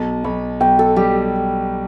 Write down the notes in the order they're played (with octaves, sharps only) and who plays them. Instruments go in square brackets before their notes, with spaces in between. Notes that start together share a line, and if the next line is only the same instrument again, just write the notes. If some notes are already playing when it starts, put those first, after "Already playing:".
Already playing: [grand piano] B1 [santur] A5
[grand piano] B1 [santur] B5
[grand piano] B1 [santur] G5
[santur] A4
[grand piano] G3 [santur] G4